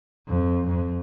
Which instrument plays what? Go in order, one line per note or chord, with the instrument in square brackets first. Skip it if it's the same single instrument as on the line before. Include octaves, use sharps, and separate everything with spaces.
[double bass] F2
F2